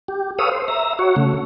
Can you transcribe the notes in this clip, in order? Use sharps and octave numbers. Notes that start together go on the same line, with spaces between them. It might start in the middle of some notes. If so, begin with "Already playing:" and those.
G4
A4 B4 C#5 F5 D#6 E6
C5
E5 A#5
F#4 C#5
C#3 A3